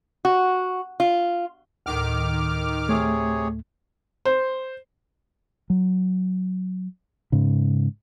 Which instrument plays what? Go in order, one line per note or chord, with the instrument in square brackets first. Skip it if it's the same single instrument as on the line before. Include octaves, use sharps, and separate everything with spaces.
[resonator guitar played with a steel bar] F#4
F4
[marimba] D2 A2 [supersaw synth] D#3 D6 F6
[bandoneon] C3 G#4 C#5 [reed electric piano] A3
[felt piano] C5
[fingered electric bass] F#3
G#2 C#3